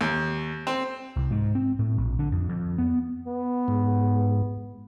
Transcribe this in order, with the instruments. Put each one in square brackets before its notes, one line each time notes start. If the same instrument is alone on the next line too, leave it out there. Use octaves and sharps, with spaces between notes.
[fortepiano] D#2
C4
[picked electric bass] C2
G#2
C4
A2
A#1
D3
F2
F2
B3
[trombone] B3
[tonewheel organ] G#2